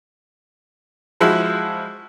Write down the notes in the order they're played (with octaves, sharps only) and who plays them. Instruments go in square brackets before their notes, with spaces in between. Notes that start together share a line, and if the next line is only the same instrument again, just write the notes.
[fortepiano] F3 G#3 E4 F#4